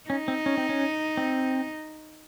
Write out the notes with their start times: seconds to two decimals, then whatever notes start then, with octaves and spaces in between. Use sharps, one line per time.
0.10 C#4 D#4
0.28 C4
0.46 C#4
0.57 C4
0.69 C#4
1.17 C4